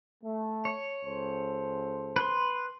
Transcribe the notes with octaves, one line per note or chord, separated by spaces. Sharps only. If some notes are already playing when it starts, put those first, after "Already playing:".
A3
C#5
C#2 A4 C5
B4 C6